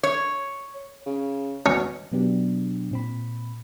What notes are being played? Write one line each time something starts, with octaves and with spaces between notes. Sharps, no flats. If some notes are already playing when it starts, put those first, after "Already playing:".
C#5
C#3
B2 C#4
B2 F#3 B3 D4 G4
A#2 C4 B5